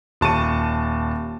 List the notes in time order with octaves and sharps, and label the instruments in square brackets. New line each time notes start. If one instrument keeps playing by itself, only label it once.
[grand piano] D#1 A5 C#6 D#7